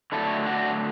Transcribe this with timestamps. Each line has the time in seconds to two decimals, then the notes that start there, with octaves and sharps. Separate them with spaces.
0.12 D3 F#3 A3 E4 A4
0.46 D4 F#4